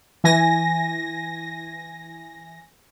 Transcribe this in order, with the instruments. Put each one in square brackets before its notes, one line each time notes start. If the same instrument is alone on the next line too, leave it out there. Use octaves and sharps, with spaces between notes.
[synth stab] E3 G#5 A#6